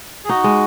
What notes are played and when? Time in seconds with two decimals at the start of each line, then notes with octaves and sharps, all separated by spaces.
0.24 G#4
0.29 D#4 F#4
0.44 G#3